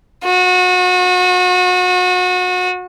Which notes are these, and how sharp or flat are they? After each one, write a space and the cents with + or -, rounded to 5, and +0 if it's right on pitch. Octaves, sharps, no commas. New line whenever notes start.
F#4 -30